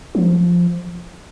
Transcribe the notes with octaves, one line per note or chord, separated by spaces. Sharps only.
F3